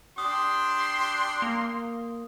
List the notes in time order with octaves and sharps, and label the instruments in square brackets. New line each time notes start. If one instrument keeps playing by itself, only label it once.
[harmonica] D4 G4 [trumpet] C6 [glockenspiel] D#6
[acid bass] A#3